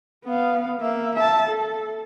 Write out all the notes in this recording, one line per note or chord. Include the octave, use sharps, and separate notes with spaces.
B3 F5
A#3 E5
E5 A5
A4